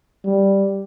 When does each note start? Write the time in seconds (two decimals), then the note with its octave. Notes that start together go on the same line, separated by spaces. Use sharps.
0.25 G3